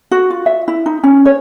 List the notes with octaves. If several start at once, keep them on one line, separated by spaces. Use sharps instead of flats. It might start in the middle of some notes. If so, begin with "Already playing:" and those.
F#4
F4
E5
E4
D#4
C#4
C#5